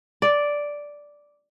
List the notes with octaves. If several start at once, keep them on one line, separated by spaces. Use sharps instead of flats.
D5